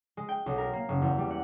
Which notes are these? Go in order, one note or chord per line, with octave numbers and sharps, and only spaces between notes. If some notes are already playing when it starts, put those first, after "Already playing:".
G#3
G5
B1
A#4
A#3
F#1
E2
G3
F#5